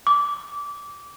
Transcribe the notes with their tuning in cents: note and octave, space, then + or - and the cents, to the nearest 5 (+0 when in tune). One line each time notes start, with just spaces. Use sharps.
D6 -20